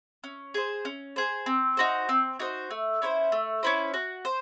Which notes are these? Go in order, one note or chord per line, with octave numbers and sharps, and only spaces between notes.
C#4
G#4 C5
C#4
G#4 C5
C4
D#4 F#4 C5
C4
D#4 F#4 C5
A3
C#4 E4 C5
A3
C#4 E4 C5
F#4
C5